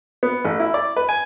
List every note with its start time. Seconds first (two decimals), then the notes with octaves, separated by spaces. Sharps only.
0.23 B3
0.45 A1
0.60 E4
0.74 D5
0.96 B4
1.09 G#5